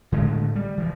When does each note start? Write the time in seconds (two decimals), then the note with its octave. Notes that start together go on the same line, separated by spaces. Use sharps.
0.12 A2 D3 G#3 A3
0.56 G3
0.77 E3 F3